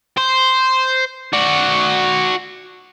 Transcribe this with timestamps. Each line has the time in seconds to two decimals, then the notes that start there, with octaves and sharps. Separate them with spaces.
0.18 C5
1.33 F#4 D5